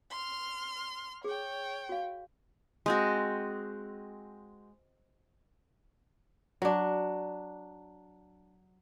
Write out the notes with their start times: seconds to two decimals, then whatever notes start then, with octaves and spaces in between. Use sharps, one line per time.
0.11 C6 F6
1.24 G#4 C#5 G5
1.89 F#4 F5
2.86 G#3 C4 F#4
6.62 F#3 D4